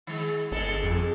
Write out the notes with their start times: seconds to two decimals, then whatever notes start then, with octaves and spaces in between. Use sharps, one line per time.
0.07 D#3 G#3
0.52 G1 G#3 A4
0.83 F2